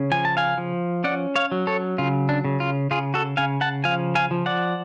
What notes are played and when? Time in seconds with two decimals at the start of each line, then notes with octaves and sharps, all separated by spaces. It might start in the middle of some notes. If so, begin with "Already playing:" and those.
Already playing: C#3 C#4
0.12 F3 G#5
0.25 A5
0.37 F5 G#5
0.58 F3
1.04 C#4 D5 F#5
1.36 C#5 F5
1.52 F#3
1.67 A4 C#5
1.98 C#3 F4
2.29 D4
2.45 C#3
2.60 F4
2.91 C#3 F4 G#4
3.14 F#4 A4
3.37 C#3 F5 G#5
3.61 F#5 A5
3.84 F3 F5 G#5
4.15 F5 G#5
4.31 F3
4.46 D5 F#5